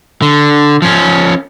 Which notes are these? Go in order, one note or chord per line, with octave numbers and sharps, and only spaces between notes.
D3
F3 C#4